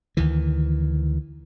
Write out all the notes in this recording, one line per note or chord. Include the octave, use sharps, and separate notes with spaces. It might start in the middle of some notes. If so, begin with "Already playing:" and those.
D2 D#3 E3